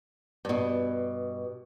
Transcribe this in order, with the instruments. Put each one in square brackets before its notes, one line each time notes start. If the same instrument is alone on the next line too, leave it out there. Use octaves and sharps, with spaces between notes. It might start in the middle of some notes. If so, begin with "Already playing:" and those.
[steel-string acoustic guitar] G2 B2